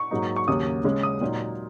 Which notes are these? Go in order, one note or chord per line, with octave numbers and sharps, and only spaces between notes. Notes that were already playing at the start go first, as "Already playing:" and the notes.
Already playing: C#6
G#2 F#3 A#3 D#4
C#6
D#2 C#3 F#3 A#3 C#4 D#6
C#3 G#3 C#4
D#6
A#2 F#3 D#4